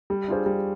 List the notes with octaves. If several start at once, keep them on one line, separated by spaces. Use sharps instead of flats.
G3
D4 F4 G#4 C5
G3